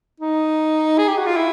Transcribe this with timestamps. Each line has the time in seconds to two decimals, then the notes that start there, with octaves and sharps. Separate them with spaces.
0.20 D#4
0.98 G#4
1.08 G4
1.18 F#4
1.26 F4
1.37 E4